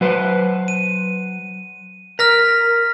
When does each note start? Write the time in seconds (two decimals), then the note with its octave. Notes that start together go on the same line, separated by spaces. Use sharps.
0.01 F#3 B4 C5
0.68 D#7
2.19 A#4 F6 A#6 B6